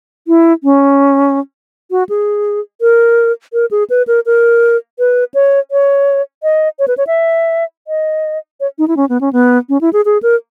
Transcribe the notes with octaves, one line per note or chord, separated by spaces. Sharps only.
E4
C#4
F#4
G#4
A#4
A#4
G#4
B4
A#4
A#4
B4
C#5
C#5
D#5
C#5
B4
C#5
E5
D#5
C#5
D#4
E4
C#4
B3
C#4
B3
C#4
E4
G#4
G#4
A#4